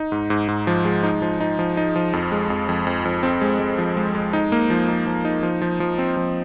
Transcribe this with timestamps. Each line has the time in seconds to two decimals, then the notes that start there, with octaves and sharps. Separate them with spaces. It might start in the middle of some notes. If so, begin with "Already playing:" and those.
Already playing: D#4
0.12 G#2
0.30 G#2
0.48 G#2
0.67 F3
0.85 G#3
1.03 D#4
1.22 F3
1.40 D#4
1.59 F3
1.77 D#4
1.96 F3
2.13 F2
2.32 G#3
2.50 F2
2.69 F2
2.87 F2
3.05 F2
3.23 C4
3.41 G#3
3.60 G#3
3.78 F3
3.97 G#3
4.15 G#3
4.33 D#4
4.52 A#3
4.70 F3
4.89 D#4
5.07 F3
5.25 D#4
5.43 F3
5.62 F3
5.80 F3
5.98 C4
6.17 F3